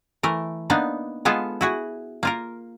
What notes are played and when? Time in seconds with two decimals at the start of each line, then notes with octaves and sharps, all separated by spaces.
0.23 E3 A3 A#4
0.70 A#3 B3 D4 D#4
1.25 G#3 B3 F4 G#4 A4
1.61 E4 F#4 G#4
2.23 A#3 F4 A#4